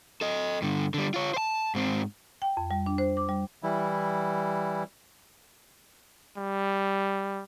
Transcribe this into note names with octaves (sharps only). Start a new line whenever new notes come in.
A4 D#5
G2 D3
D3 G3
F4 C#5
C5 A5
G#2 C4
G5
F2
G3
D4
C5
D6
G3
E3 G3 E4
G3